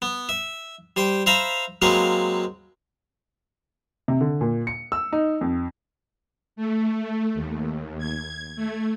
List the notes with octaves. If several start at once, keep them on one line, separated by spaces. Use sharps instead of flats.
B3
E5
G3 C5 G5
C5 E5 F5 A#5 B5
F#3 G#3 A#3 C4 B4 F5
C3
D3
A#2
C#7
E6
D#4
F2
A3
D#2
G#6
A3